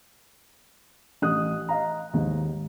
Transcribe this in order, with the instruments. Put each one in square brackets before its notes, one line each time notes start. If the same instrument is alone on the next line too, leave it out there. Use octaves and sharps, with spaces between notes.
[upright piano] A1 D#6 F#6
D#5 F5 A#5
D#2 G#2